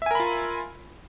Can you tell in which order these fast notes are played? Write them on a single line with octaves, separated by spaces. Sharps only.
E5 G#5 A#4 B5 F4